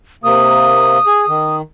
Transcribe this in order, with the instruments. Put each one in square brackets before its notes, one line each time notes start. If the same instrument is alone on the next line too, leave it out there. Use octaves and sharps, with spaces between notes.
[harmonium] C3 A#3 [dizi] D#6
[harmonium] G#4
D#3